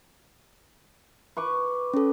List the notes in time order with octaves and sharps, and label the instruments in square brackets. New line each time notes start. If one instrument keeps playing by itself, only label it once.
[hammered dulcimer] B4 C#6 D6
[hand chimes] C#4 A4